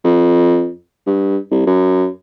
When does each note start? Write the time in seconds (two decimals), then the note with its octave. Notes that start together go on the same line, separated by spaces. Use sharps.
0.05 F2
1.07 G2
1.51 C2
1.66 F#2